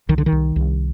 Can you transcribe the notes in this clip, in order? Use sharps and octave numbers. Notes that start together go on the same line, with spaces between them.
C2 D#3
D3
D#3
C2
C2